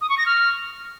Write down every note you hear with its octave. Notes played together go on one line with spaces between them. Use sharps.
D#6
C#6
A#6
F6